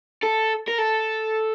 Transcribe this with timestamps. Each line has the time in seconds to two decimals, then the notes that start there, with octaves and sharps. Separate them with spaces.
0.23 A4
0.68 A#4
0.78 A4